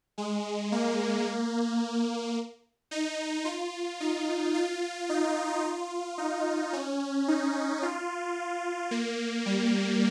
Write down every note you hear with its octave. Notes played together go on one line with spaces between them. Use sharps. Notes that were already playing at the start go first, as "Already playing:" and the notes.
G#3
A#3
D#4
F4
D#4
F4
D#4
F4
D#4
C#4
D#4
F4
A#3
G3